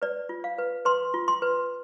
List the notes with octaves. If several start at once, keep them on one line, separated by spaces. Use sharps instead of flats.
B4 D5
F4
F5
B4
B4 C6
F4
C6
B4